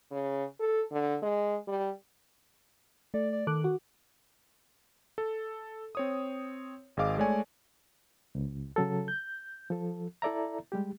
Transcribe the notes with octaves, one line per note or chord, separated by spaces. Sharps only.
C#3
A4
D3
G#3
G3
A3 D5
D5
D#3 A4 D6 F#6
F#4
A4
C4 C#5 D#6
G#1 G#4 D#5 F5 D6
G#3 A3 C#5 D5 G#5
C#2
C#3 F#3 A4
G6
F3 A4
E4 A4 D5 E5 A#5
G3 G#3 G4